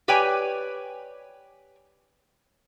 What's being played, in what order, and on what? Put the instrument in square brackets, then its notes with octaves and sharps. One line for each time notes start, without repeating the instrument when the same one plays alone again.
[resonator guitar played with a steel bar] G4 B4 C#5 D5 G5 G#5